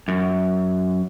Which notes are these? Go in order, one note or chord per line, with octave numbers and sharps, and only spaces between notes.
F#2